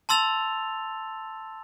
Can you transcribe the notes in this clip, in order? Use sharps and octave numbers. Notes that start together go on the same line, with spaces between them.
A5 C6 E6 A6 F7